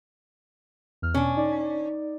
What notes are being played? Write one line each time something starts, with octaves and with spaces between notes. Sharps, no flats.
E2 F6
B2 C#4 D4
D#4 D5